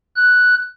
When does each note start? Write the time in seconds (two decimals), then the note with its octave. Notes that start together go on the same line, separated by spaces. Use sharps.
0.16 F#6